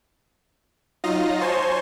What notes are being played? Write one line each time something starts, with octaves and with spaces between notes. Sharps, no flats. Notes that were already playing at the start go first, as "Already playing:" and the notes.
F#3 D#4 F4 D#5 F5 A#6
C5 C#5 G#5 A5 C6